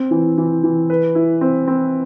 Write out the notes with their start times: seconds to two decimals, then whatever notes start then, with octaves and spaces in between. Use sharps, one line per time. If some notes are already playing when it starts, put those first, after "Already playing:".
Already playing: C4
0.11 E3
0.38 E3
0.63 E3
0.90 B4
1.15 E4
1.41 C4
1.68 C4